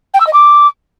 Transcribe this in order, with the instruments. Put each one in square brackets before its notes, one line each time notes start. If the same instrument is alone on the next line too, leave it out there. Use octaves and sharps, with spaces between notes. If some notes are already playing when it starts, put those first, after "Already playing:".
[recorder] G5
E6
D#5
D6